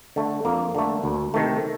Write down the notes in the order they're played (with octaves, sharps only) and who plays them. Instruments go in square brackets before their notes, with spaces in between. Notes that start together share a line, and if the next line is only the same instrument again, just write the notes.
[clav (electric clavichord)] D3 A3
F2 A#3
D3 A3
D2
C3 D#3 A3